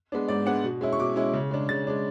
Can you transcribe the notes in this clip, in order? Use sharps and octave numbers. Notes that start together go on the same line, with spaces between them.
G#3 B3 D4
G#2 D5
G#3 B3 D4 F#5
B2
G#3 C#4 E4
C#6
B2 D6
G#3 C#4 E4
C#3
G#3 D4
C#3 A6
G#3 D4